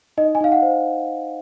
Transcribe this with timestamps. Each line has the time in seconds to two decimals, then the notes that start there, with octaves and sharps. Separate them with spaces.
0.17 D#4 D#5
0.35 G#5
0.41 D#4 F5
0.52 F#5
0.62 C5